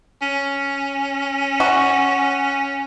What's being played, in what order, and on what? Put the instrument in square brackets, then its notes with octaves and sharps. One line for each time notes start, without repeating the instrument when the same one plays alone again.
[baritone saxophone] C#4
[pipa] F#4